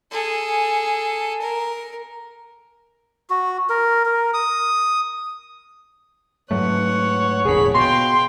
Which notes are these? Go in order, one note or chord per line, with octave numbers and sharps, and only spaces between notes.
G#4 A4
A#4
F#4
A#4
A#4
D#6
G#2 F#3 A3 B4 C#5 F#5
E1 A#1 D3 G#4 A#4 B5
B2 F5 G5 C6